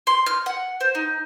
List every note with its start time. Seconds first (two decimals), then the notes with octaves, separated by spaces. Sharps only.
0.07 C6
0.26 F6
0.46 F#5
0.81 C5
0.95 D#4